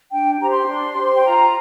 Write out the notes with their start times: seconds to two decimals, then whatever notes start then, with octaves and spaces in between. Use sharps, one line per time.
0.11 D4 G5
0.40 G4 C5 A#5
0.49 C6
0.68 D4
0.96 G4 C5
1.14 G5
1.24 F4 A#5